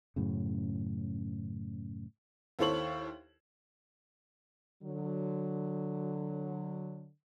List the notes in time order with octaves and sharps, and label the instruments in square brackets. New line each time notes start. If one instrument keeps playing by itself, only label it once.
[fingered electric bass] F#2 A2 C#3
[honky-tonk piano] D#2 E4 A4 C5 C#5 F#7
[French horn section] D3 F#3